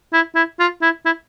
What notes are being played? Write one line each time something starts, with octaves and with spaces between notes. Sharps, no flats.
E4
E4
F4
E4
E4